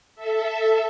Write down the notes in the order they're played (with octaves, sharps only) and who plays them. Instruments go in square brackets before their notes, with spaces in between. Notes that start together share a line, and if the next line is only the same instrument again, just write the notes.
[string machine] A4 E5